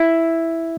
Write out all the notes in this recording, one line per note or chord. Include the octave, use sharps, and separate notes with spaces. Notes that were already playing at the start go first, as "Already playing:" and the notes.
Already playing: E4